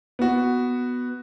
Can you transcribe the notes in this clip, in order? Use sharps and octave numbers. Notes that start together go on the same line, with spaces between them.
B3 F#4